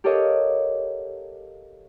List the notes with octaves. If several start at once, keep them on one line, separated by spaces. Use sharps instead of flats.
G4 A4 A#4 C#5 D#5 F5